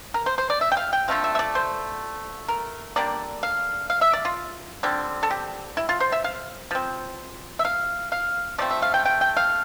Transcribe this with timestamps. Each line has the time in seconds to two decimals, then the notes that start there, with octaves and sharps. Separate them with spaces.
0.14 A#4
0.26 C5
0.38 C5
0.50 D5
0.61 E5
0.72 G5
0.77 F5
0.93 G5
1.08 D3 F3 A3 C4 F5
1.24 E5
1.35 E5
1.39 D5
1.55 C5
2.48 A#4
2.96 D3 G3 A#3 D5
3.43 F5
3.90 F5
4.01 E5
4.13 D5
4.25 F4
4.83 D3 G3 C4
5.23 A4
5.31 G4
5.77 E4
5.89 F4
6.00 C5
6.12 E5
6.24 F5
6.71 F3 C4
7.59 E5
7.65 F5
8.12 F5
8.58 F3 A3 C4 D5
8.71 E5
8.82 F5
8.94 G5
9.05 G5
9.21 G5
9.37 F5